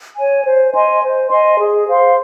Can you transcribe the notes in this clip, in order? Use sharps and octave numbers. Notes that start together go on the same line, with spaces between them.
C#5 G#5
C5
D#5 G#5 C6
C5
D#5 G#5 C6
G#4
C5 F5 C6